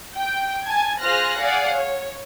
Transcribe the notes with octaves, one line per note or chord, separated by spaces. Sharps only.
G5
G#5 A5 G#6
F4 G#4 C5 F6 F#6 A#6
G#4 D5 F5 F#5
C#5